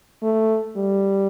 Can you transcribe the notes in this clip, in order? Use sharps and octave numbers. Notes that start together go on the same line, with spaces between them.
A3
G3